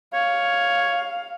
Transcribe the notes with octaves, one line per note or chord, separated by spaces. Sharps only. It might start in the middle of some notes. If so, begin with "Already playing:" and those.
C#5 F5